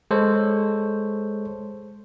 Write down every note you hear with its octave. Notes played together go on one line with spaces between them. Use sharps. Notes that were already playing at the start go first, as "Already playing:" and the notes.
G#3 A4 C5 C#5